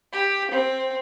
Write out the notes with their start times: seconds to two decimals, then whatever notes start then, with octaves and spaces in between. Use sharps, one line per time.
0.13 G4
0.51 C4